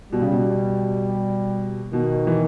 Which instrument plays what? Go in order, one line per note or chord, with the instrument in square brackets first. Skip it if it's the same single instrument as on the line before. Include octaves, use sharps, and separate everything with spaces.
[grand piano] B2 [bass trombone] G3
[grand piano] C#3
B2
[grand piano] B2 [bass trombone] D#3
[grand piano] E3